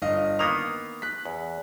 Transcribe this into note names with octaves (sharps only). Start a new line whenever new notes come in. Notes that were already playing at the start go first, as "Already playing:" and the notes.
G1 D#5 F5
D#3 A#3 B3 D#6 F7
F#6 B6
E2